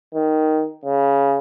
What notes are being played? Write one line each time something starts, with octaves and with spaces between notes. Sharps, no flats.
D#3
C#3